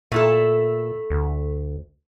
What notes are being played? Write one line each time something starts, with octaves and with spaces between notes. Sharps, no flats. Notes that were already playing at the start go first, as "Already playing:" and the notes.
A#2 A3 E4 A4
D2